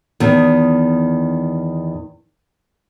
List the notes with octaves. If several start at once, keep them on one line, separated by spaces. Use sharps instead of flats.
E2 D#3